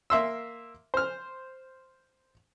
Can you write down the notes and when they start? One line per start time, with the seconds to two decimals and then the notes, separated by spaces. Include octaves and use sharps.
0.10 A#3 E5 C6 E6
0.94 C5 F6